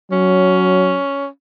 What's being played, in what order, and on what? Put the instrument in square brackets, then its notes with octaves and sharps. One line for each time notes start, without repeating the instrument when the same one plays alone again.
[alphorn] F#3 [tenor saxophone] C#4